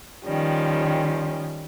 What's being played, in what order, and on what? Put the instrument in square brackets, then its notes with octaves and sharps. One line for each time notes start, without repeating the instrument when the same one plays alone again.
[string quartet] D#3 F3 G3 C#4